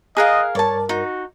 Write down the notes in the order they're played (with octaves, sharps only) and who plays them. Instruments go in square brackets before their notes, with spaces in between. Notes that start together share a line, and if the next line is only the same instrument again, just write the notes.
[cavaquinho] G#4 A#4 F5 [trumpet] D#5 [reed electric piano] D#6 F#6
[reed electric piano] G2 A#4 [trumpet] C#5 [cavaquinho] D5 A5
[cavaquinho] D#4 [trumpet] F#4